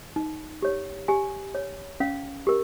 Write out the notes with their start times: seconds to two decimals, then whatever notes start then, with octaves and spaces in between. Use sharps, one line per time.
0.16 D#4
0.62 G4 C#5
1.08 G4 G#5
1.55 C#5
2.00 C#4 F5
2.47 G4 A#4